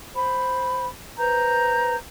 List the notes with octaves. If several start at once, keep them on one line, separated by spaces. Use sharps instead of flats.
C5 B5
B4 C5 A#5 G6